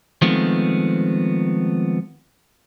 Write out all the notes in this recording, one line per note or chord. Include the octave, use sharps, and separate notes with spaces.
D#3 F3 G#3 A3 B3 C4